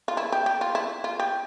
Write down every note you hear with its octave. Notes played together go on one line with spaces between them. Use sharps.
F4
E4
G4
G4
F4
E4
F4
G4